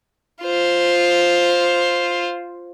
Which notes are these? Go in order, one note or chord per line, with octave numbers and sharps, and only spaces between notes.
F4 C5